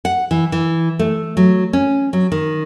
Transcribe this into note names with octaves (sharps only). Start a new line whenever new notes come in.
F#5
E3
E3
A3
F#3
C#4
F#3
D#3